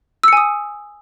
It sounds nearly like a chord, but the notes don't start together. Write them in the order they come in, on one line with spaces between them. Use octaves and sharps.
E6 C#7 G#5 D#6